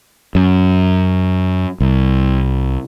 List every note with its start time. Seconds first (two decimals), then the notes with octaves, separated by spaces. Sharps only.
0.35 F#2
1.80 C2